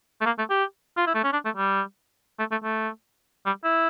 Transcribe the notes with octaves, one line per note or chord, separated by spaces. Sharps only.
A3
A#3
A3
G4
F4
E4
A3
C#4
D4
A3
G3
A3
A3
A3
G3
E4